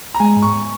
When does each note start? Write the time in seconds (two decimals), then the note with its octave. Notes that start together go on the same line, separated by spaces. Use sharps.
0.14 A#5
0.20 G#3 G#5
0.36 G#2
0.42 C#6